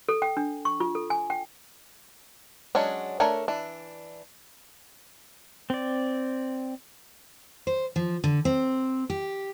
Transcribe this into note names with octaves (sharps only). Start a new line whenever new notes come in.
A4
G5
D4
C#6
F4
A4
G#5
G5
F#3 G#3 C#4 D4
A3 D4 A#4 C#5
E3 D4
C4 D5
C5
F3
D3
C4
G4